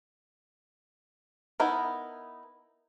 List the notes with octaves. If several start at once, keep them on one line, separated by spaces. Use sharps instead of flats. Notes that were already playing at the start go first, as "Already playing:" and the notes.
B3 D#4 E4 A#4